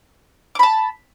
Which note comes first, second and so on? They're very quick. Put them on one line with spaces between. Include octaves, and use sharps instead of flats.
D6 B5 A5